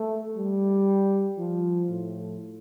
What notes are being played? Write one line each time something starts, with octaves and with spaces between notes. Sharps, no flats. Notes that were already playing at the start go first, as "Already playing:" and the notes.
Already playing: A3
G3
F3
A2